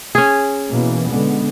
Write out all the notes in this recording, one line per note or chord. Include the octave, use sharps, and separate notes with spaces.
C#4 G#4
B2 E3 A#3
D3 G#3 B3